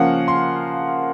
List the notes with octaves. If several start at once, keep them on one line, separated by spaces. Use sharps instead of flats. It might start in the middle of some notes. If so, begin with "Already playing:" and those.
Already playing: C#3 F3 A#3 C#4 F#5
C6